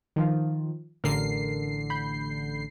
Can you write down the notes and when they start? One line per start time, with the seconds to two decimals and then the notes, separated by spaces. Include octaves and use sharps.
0.16 D#3 F3 F4
1.04 A1 D3 A#4 C7
1.90 B5 G6